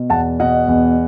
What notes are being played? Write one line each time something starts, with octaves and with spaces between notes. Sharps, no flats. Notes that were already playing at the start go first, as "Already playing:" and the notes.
Already playing: B2
E2 F#5 A5
B2 D#5 F#5
E2